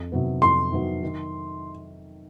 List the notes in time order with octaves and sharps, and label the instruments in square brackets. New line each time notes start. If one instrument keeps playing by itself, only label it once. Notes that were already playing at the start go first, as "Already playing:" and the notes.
Already playing: [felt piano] F2
C3 D#3 F#3 B3
[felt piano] F2 [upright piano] C6
[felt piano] C3 D#3 F#3 B3
D#3